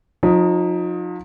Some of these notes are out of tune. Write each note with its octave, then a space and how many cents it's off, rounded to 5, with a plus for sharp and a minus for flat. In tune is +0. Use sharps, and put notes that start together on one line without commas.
F3 +40 D#4 +0